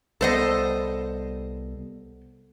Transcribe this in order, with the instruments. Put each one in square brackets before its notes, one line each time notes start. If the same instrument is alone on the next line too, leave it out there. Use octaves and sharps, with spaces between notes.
[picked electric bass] C2 G3 B3 [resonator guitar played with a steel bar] A4 C5 D#5